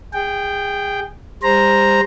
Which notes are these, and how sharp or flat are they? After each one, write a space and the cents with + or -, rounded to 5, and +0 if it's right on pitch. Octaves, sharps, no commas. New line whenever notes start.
G#4 -25 G5 +0
G3 +35 C5 +0 A#5 +0